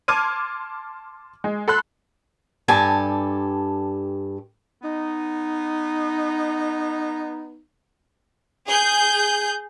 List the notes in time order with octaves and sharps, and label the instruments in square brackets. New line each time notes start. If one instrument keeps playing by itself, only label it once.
[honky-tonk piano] A5 C6 D6 F6 G#6 D#7
G#3
A4 B5 C6 F#6
[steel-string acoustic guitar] G2 G4 A4 G#5 A5
[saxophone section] B3 D#4
[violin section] G#4 G6